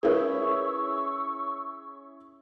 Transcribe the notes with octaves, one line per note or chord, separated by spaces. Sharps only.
C#4 E4 G#4 A#4 B4 C#6 E6